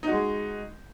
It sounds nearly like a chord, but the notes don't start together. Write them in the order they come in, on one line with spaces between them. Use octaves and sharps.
D#4 F#4 G#3